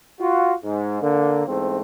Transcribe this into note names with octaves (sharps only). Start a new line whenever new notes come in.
F4 F#4
G#2
D3 A#3
E2 G#2 A3 C4